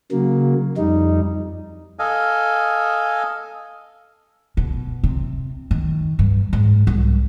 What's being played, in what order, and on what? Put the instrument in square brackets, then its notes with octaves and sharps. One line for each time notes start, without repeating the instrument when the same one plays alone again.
[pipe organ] C#3 F#3 A#3
F2 G3 D#4
[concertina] A4 D#5 F5 G#5
[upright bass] B2
C3
D#3
G2
G#2
C2